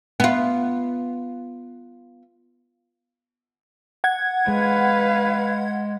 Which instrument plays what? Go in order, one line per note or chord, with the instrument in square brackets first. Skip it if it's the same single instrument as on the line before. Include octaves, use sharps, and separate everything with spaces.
[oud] B3 F4
[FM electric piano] F#5 G#6
[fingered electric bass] G#3 [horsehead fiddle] B4 F5